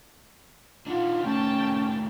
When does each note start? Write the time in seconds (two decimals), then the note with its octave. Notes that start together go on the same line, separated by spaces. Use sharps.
0.87 D4 D#4 F4 F#5
1.23 C3 D#3 A3 C#4 G5 A5